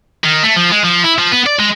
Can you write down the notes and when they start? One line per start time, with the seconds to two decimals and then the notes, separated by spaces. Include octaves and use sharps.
0.24 D#3
0.44 A3
0.56 F3
0.72 G#3
0.84 F3
1.04 E4
1.19 F3
1.32 B3
1.46 D5
1.59 G#3